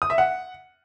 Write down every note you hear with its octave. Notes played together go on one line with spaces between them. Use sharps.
D#6
E5
F#5